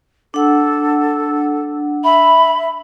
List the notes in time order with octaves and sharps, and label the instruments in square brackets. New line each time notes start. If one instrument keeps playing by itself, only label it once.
[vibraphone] D4 F#5 [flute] A4
[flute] E5 [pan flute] B5